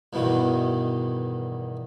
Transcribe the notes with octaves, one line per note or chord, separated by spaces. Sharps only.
E2 G2 B2 D#3